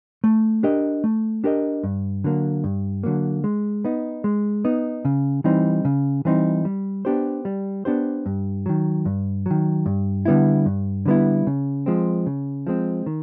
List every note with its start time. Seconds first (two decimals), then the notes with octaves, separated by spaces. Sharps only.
0.24 A3
0.63 D4 G4 A#4 D#5
1.04 A3
1.44 D4 G4 A#4 D#5
1.83 G2
2.24 D3 F#3 A#3
2.64 G2
3.03 D3 F#3 A#3
3.44 G#3
3.85 B3 D#4
4.24 G#3
4.65 B3 D#4
5.05 C#3
5.44 E3 G3 C4 D#4
5.85 C#3
6.25 E3 G3 C4 D#4
6.65 G3
7.05 B3 D4 G4 C5
7.45 G3
7.85 B3 D4 G4 C5
8.26 G2
8.66 D#3 F#3
9.05 G2
9.46 D#3 F#3
9.86 G2
10.25 D3 G3 B3 E4
10.66 G2
11.06 D3 G3 B3 E4
11.47 C#3
11.86 F3 G#3 C4
12.26 C#3
12.67 F3 G#3 C4
13.06 D#3